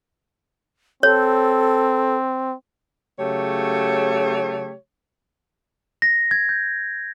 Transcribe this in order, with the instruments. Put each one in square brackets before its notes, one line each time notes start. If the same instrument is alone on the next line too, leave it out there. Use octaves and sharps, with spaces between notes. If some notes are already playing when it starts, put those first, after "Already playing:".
[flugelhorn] C4 [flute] A4 [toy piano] C#5
[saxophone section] C#3 F#3 A3 G4 C#5
[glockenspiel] A#6
G#6
G6